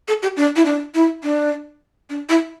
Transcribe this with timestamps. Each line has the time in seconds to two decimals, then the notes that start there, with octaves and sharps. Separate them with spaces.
0.08 A4
0.23 G4
0.37 D4
0.56 E4
0.65 D4
0.94 E4
1.23 D4
2.10 D4
2.29 E4